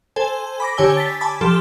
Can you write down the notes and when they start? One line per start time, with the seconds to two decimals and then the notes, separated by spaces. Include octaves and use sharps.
0.16 A4 C5 G#5
0.60 B5 D6 A#6
0.77 D3 G4 C#5 G#5 E6 G7
0.97 A6 B6
1.21 G#5 A5 B5 D6
1.41 F3 G4 A4 C6